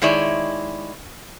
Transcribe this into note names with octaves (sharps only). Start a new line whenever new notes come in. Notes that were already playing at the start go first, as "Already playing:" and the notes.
D#3 G#3 E4 C#5 D5